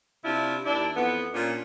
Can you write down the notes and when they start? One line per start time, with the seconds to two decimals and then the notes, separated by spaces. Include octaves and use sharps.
0.24 C3 D4 E4 F4
0.65 D#2 D4 E4 D5
0.96 F2 E3 B3
1.34 A#2 C#4 D4 F4